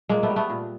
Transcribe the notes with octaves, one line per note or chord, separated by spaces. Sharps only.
A#2 G#3 A#3
A3 B3
G3
A3 B3
A#2